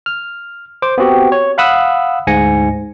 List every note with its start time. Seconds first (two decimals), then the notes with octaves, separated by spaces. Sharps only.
0.06 F6
0.82 C5 D6
0.98 B3 C4 F#4 G4
1.32 C#5
1.58 F5 F#5 B5 D#6 E6 F#6
2.27 D2 G#2 G#5 A#6 C#7